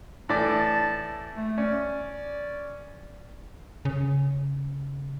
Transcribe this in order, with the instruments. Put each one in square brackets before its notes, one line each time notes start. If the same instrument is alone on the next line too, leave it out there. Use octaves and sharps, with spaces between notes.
[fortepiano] A2 E3 D5 [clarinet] A5
[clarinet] A3
[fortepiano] C#4 [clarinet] D5
[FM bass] C#3